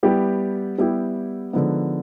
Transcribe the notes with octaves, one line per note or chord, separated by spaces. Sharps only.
G3 B3 E4 G4
G3 B3 E4 G4
D3 F3 G#3 B3 D#4